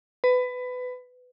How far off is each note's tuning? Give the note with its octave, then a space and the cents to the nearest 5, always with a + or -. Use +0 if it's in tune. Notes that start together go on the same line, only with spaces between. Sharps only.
B4 +20